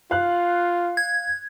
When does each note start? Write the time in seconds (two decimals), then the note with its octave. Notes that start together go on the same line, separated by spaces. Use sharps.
0.11 F4 F5 F#6
0.97 G#6